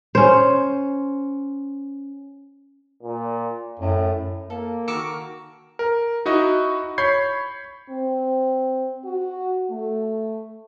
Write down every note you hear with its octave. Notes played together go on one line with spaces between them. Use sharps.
C#4 C5
A#2
F#2 A2
A#3 A4
D#3 F#4 A#4 D6 E6 C#7
A#4
D#4 E4 F#4 D#5
C#5 B5 C#6 G6 G#6 C7
C4
F#4
A3